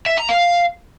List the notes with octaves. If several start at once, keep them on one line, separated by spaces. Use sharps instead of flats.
E5
A#5
F5